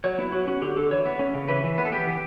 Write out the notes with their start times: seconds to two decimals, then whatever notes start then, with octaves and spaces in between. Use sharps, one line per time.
0.04 F#3 C#5
0.18 B3 E4
0.32 F#3 F#4
0.47 C#4 F#4
0.62 D3 G4
0.76 D3 A4
0.91 E3 C#5
1.06 B3
1.19 C#4
1.34 C#3
1.48 E3 B4
1.64 E3
1.78 B3 B4
1.85 A4
1.92 B3 G4
2.07 E3